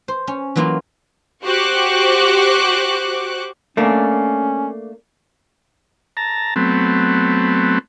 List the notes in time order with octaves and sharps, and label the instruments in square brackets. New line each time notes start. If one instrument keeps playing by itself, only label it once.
[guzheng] C5
C#4
E3 F#3 A#3 E4 F4
[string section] F#4 G4 C5 C#6 D6 F#6
[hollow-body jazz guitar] A3 A#3 D4 [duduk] C#4
[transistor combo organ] A5 A#5
F#3 A3 B3 C4